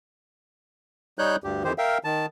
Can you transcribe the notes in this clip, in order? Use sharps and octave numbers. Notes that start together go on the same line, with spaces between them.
G3 D#4 C#5 F#6 G6
D2 G2 G4
F2 D#3 E3 G4 C5
A#4 E5 F5 G5
D#3 A5